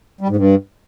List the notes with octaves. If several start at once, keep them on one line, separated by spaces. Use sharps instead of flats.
G3
G#2
G2